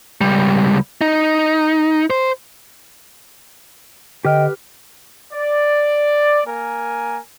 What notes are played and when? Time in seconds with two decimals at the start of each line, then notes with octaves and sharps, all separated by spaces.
0.21 C#2 G3
1.01 D#4
2.10 C5
4.25 D3 G4 B4 D#5 G5 F6
5.34 D5
6.47 A#3 A#4 G#5